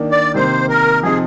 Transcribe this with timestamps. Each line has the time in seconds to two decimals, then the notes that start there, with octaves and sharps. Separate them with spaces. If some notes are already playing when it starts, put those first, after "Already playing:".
Already playing: D#3 A#3 D4
0.11 D5
0.34 C3 D#3 A#3 C5
0.69 A#4
1.03 C3 F3 C4 D#4 G#4